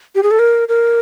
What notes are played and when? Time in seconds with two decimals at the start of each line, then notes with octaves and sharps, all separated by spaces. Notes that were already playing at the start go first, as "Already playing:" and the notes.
0.15 G4
0.23 G#4
0.31 A4
0.39 A#4
0.68 A#4